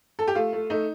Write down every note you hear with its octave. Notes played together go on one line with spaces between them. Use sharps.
A4
G4
A3 F4
A3
A3 D#4